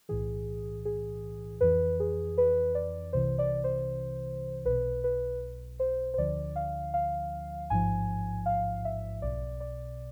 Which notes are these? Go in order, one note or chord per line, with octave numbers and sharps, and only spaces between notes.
B1 A2 E3 G#4
G#4
F2 E3 B4
G#4
B4
D5
C2 C3 E3 C5
D5
C5
B1 B2 B4
B4
C5
C5
D2 D3 F3 D5
F5
F5
A1 G#2 F3 G#5
F5
E5
B1 B2 D5
D5